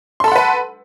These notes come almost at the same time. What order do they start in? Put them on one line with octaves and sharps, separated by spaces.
C6 A4 B5 F#5 B4